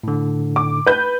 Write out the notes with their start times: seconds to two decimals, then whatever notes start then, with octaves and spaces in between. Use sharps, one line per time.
0.04 A2 D3
0.56 D6
0.86 B4 G6